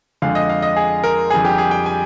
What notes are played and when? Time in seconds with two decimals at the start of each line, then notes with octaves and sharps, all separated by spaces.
0.22 F2 D3 G#3 F5
0.35 D#5
0.49 F5
0.62 D#5
0.76 G#4
1.04 A#4
1.30 F2 D3 G3 G#4
1.45 G4
1.58 G#4
1.71 G5
1.86 G#5